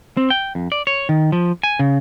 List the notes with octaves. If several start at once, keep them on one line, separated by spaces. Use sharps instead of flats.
C4
G5
F2
D5
C#5
D#3
F3
G#5
C#3